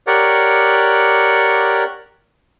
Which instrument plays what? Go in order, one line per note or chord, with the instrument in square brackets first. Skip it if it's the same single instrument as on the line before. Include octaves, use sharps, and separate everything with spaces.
[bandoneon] G4 A#4 C#5 D5 F#5